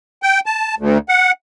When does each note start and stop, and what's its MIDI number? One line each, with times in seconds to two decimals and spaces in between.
0.23 0.40 79
0.46 0.75 81
0.79 0.98 38
1.09 1.31 78